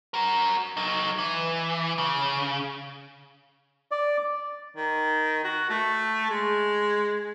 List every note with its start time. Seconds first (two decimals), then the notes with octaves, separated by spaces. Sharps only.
0.14 F#4 A#4
0.77 F#3 D#4
1.18 E3
1.98 C#3
3.91 D5
4.77 D#3
5.44 F#4
5.70 A3
6.30 G#3